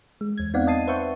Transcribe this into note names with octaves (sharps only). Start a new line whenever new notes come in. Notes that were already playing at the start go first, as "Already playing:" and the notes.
G#3
E2 G#6
B3 C4 D#4 D5 F5 F#5
D#5 A5 A6 C7 D#7
B4 C5 E5 F#5 C#6 G6